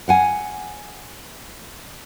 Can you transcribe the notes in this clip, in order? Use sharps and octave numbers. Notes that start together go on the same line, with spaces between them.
F5 F#5 G#5